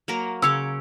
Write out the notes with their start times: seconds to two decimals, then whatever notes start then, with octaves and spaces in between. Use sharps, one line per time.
0.08 F#3 A#3 A#4
0.42 C#3 C#5 F#5 C6 D6 E6